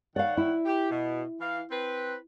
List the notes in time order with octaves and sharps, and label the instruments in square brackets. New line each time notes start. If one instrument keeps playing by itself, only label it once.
[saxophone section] D#3 C#5 F#5 [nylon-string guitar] D5 F5
[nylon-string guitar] E4
[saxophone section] G4
B2
E3 F5
C4 B4